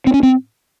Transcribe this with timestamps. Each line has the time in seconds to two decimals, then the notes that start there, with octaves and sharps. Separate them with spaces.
0.07 C4
0.14 C#4
0.23 C4